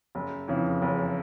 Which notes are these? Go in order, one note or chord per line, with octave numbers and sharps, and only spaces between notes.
F#1
F2 C#3 E3
F#1